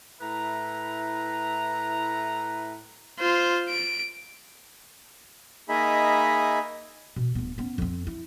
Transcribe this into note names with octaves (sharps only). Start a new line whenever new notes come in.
A2 E4 B4 A#5
F4 C5
D7
A#3 D#4 G#4 D#5 E5 B5
B2
D1 B3
B3 C#4
F2 C4
E4